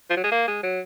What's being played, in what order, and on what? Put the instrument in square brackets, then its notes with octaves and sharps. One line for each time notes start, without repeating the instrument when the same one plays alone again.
[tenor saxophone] F3
F#3
G#3
A#3
G#3
F#3